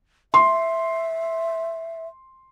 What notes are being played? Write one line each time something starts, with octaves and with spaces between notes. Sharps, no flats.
E5 C6